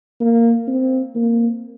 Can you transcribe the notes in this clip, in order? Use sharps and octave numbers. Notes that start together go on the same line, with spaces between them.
A#3
C4
A#3